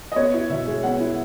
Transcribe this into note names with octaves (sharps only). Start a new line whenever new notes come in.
D#5
B3 C#5
E4
B2 E5
G#3
B3 F#5
E4